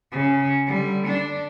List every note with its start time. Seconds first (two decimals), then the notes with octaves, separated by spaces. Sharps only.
0.12 C#3
0.66 D3 G3
1.07 D4